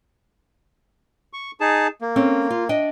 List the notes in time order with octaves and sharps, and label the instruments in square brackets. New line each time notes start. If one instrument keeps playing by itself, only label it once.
[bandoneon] C#6
D#4 G#4 A5
A#3
[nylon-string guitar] C4 C#4 A4
F4
D4 D#5 G5